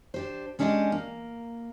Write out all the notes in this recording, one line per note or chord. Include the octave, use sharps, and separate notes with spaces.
D4 G4 C5
G#3 C#4 D4 E4 G4 D#5
A#3